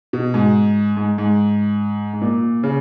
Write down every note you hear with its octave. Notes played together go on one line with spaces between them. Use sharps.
B2
G#2
G#2
G#2
G#2
A#2
C#3